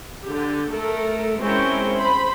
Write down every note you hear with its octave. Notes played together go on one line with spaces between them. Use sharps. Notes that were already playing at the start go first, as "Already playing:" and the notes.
D3 G4
A3 A4 A#4
G#3 C4 C#4 E4 A#4 G5
C5 B5